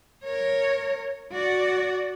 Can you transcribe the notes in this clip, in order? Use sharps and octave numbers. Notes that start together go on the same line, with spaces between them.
A#4 C#5
F#4 D5